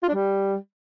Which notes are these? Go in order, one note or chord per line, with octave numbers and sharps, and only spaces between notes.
F4
D4
G3